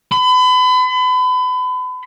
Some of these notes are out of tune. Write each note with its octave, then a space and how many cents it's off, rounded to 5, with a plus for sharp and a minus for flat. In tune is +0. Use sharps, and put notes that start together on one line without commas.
B5 +35